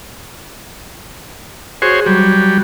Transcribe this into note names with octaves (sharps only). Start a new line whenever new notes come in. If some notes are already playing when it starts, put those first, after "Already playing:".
F#4 G#4 C5 C#5
F#3 G3